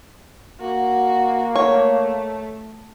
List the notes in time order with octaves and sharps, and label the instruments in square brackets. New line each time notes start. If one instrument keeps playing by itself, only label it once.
[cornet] A#3 [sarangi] F#4
[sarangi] A3 [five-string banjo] C#5